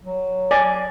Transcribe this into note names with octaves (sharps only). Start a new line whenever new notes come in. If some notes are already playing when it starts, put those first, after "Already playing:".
F#3
D5 G#5